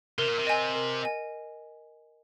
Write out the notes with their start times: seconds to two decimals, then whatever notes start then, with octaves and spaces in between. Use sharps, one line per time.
0.18 C3 A#4
0.28 A#2
0.39 C3
0.47 D#5 G#5
0.75 A#4
1.03 D#5 G#5